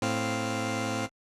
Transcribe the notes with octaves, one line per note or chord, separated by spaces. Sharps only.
A2 C4 F5